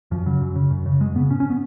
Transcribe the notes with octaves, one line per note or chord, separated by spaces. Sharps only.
F#2 F3
C#3 F#3
F#2
C#3
F#2
C#3
F#2 G#3
C#3 B3
G#2 C#4
C#4
B3